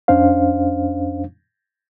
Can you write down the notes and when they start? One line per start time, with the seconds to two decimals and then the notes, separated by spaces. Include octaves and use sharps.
0.08 F2 C#4 D4 C5 F5